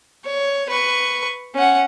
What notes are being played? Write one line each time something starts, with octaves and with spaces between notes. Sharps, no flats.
C#5
B4 C#6
C#4 F#5